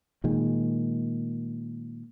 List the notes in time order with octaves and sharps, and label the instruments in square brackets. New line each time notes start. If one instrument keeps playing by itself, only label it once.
[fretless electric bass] A#2 D#3 G#3